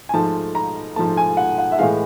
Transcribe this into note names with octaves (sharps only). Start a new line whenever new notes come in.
G#5
G#2 F3 A3 A5
A#5
G#2 F3 A3 A5
G#5
F#5
F#5
E5
A2 E3 G#3 F5